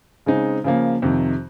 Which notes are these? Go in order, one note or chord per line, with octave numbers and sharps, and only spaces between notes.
C#3 G#3 C4 D#4
C#3 F3 A#3
F2 C3 D#3